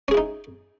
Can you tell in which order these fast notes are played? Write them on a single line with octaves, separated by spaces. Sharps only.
C#4 G#4 E4 D#4